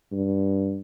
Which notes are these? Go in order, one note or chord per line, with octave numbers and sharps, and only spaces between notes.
G2